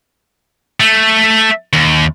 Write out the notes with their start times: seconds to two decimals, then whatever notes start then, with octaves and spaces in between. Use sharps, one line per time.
0.80 A3
1.73 D#2